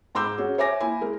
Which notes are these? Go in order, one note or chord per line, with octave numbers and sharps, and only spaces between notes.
G#2 A#5 C6 D6 E6 G6
C#4 F#4 G#4
C#5 E5 G#5 D6 A#6
A#3 E4 G#5
G#3 A#4